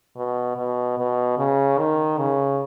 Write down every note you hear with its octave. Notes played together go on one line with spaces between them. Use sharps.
B2
B2
B2
C#3
D#3
C#3